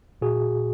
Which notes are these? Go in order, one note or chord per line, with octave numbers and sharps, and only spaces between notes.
A#2 F#4 G#4